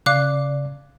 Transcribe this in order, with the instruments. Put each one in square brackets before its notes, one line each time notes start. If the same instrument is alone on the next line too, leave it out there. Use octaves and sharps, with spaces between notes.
[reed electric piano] C#3 D5 [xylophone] F5 D6 F#6